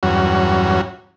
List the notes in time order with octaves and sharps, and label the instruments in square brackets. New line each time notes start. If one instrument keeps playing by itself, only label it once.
[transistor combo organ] E2 G2 F#3 C#4 F#4